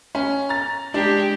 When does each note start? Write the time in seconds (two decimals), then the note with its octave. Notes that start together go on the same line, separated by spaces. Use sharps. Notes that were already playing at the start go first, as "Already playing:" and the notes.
0.15 C#4
0.49 A#5 A6
0.94 G#3 D4 G4